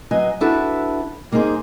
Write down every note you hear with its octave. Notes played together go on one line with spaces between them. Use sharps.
F#3 B4 D#5 G#5
D4 E4 F#4 A4 B4
G3 A#3 B3 D#4 G#4 C5